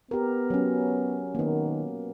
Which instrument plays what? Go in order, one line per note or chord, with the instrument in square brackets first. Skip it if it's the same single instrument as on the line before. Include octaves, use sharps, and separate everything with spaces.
[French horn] B3 [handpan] G4 A#4
[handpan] F#3 C#4
[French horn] D#3 [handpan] A#3 B3